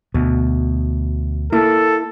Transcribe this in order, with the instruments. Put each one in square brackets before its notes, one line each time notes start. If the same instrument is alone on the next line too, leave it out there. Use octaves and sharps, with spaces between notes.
[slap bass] D2 [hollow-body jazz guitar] B2
[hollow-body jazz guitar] A#3 E4 [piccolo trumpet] A4